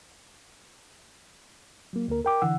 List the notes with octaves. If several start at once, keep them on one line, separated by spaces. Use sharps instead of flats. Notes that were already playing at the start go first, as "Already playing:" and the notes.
F#3 A#3
D2 A#3 A#4
A#4 G5 D6
D3 E3 F#5 E6